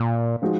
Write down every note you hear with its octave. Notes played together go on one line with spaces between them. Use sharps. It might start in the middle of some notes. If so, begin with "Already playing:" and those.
Already playing: A#2 A#3
F3 G#3 D#4 F#4